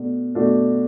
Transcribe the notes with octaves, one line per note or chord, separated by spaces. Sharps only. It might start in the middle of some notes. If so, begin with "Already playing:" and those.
Already playing: B2 A3 D4
B2 A3 D4 F#4